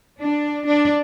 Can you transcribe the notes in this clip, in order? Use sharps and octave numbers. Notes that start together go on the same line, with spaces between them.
D4
D4